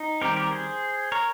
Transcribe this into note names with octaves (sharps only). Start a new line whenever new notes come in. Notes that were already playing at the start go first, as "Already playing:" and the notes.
Already playing: D#4
D#3 G3 C4 G4 A#4
G4 A#4
G#4 C5
A#4 C#5